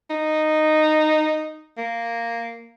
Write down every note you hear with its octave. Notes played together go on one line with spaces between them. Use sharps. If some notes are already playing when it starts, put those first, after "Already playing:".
D#4
A#3